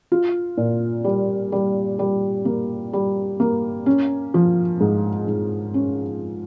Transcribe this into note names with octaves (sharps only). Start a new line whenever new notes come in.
F4
A#2
G3
G3
G3
A#3
G3
A#3
C#4
F3
G#2
G#2
C#4